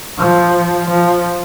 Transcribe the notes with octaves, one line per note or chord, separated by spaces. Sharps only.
F3
F3